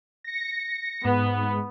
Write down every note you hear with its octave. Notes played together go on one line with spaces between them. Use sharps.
A#6 C#7
G#2 B3